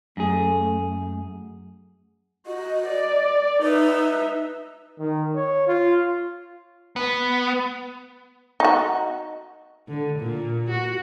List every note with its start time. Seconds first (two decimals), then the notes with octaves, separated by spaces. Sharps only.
0.17 F#2 A3 G#4
2.46 F#4 D#5
2.87 D5
3.62 D#4 B4 E5
4.99 D#3
5.35 C#5
5.67 F4
6.96 B3
8.60 D#4 F#4
9.88 D3
10.19 A#2
10.70 F#4